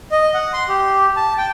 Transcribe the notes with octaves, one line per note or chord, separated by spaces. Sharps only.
D#5
F#5
C6
G4
A5
G5